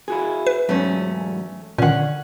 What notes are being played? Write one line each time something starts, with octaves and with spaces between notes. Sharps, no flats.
E4 F#4 G#4
B4
E2 G#2 F#3 A3 C#4
A#2 D3 D#3 C#4 F#5